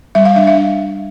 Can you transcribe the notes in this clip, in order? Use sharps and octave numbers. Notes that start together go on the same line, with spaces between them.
G3 E5
F5
D4 E5
E5